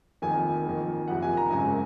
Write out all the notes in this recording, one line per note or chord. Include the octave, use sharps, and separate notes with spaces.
F1 F2 D#3 A#3 G#5
F2 D#3 A#3
F#1 F2 C3 F#5
G#5
A#5
G#1 F#2 C#3 G#3 G#5